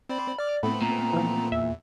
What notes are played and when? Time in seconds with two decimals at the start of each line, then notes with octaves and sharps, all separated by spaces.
0.09 C4 C5 D5 B5
0.39 D5 D6 F6
0.63 A2 A3 B3 C4 B5
0.82 A#2 A#5
1.13 E3 F3
1.52 E2 E5